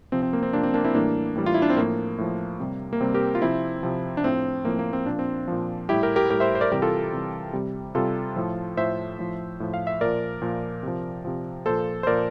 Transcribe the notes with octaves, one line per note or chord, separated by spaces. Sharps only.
C3 F3 C4
C4
A#3
C4
C3 F3 A#3 D4
C4
A#3 D4
C4 E4
A2 E3 G3 A#3 D4
A2 E3 G3
F4
E4
D4
C4
A2 F3 A#3
A2 F3
C3 G3
A#3
C3 G3 C4
G4 A#4
F4
C3 F3 C4 E4
C3 F3
D4
A2 F3 C4
A2 F3 A#3
A#3
C4
A#2 F3 D4
C4
A#2 F3
A2 G3 E4 G4
G4 A#4
G4 A#4
A2 G3 G4 A#4
C5 E5
C5
A#4 D5
C3 E3 G3 G4 A#4
F4 A4
C3 E3 G3
C3 G3
C3 G3 F4 A4
A2 F3
A2 F3 C5 E5
A2 F3
A2 F3
F5
E5
A#2 F3 A#4 D5
A#2 F3
C3 F3
C3 F3
A#2 F3 A4 C5
C5
A#2 F3 A#4 D5